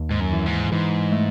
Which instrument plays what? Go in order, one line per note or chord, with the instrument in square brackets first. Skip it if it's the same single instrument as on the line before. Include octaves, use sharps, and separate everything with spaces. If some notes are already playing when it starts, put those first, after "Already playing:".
Already playing: [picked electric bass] D#2
[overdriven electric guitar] G#2
F#2
[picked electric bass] E3
[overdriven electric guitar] G#2
[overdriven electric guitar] G#2 [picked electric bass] E3
[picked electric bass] A3